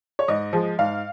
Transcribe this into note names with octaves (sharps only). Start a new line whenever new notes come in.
C#5
G#2 D#5
F3 G#3
G#2 F5